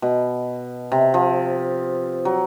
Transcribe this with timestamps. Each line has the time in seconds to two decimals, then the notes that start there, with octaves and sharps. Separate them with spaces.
0.02 B2
0.92 C3
1.14 F3
2.25 F#3